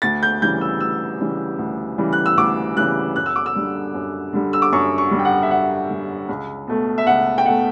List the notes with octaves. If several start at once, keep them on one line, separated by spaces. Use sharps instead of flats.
D2 A6
G6
C#3 E3 G3 G6
E6
D2 E6
C#3 E3 G3
D2
C#3 E3 G3
F#6
E6
D2 D6
C#3 E3 G3 F#6
F#2 F#6
E6
D6
E6
D3 G3
F#2
D3 G3
E6
D6
F#2 C#6
C#6
D3 G3
G5
F#5
E5
F#2 F#5
D3 G3
C#2
B2 A3
E5
C#2 F#5
G5
B2 A3 F#5